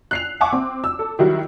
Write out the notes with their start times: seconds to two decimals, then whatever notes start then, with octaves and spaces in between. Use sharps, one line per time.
0.11 F#6 C7 F7
0.41 E5 F#5 G#5 A5 C#6 D6
0.53 C4
0.84 E6
0.99 A4
1.19 D#3 F#3 G3 E4 F#4